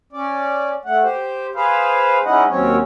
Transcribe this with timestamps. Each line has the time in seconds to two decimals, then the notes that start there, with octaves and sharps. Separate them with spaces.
0.13 C#4 D5
0.85 A3 F#5
1.03 G4 C5
1.55 G#4 B4 C5 F5
2.25 G#3 C#4 D#4 E4 D#5 F#5
2.49 D#2 F#3 C4 C#4 C#5